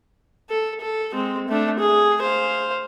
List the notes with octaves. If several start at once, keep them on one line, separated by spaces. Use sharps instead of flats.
A4
A4
G#3 C4
A3 D4
G#4
C5 F5